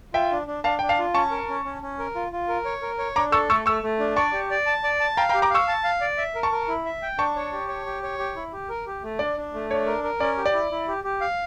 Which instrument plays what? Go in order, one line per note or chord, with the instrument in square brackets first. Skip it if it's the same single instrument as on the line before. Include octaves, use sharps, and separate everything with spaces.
[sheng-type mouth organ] F4 [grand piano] E5 G5
[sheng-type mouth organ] D4
D4
[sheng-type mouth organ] D4 [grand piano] F5 A5
[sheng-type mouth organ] D4 [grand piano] G5
[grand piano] F5 A5
[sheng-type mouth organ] F4
[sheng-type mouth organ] C#4 [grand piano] A5 C#6
[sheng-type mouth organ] A#4
C#4
C#4
C#4
A#4
F4
F4
A#4
C#5
A#4
C#5
[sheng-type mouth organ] D4 [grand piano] A#5 D6
[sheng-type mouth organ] A4 [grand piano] C#6 E6
[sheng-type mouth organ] A3 [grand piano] C#6 E6
[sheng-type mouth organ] A3 [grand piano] C#6 E6
[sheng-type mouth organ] A3
D4
[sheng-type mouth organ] D5 [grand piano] A5 C#6
[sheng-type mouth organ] G4
D5
A5
D5
A5
[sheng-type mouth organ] F5 [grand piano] G5 A#5
[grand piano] G5 A#5
[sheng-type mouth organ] G4
[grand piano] A#5 D6
[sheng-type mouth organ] F5 [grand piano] C#6 E6
[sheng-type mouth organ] A5
F5
D5
E5
A#4
[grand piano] A5 C#6
[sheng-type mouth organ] A#4
E4
E5
G5
[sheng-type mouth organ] D4 [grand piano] A5 C#6
[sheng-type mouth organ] C#5
G4
C#5
G4
C#5
G4
E4
G4
A#4
G4
A3
[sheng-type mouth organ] D4 [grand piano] D5
[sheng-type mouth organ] D4
A3
[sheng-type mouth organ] D4 [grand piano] C#5
[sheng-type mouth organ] A#4
A#4
[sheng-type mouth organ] C#4 [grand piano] D5
[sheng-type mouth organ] G4
[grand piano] D5
[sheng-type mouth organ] E4
E4
G4
G4
F5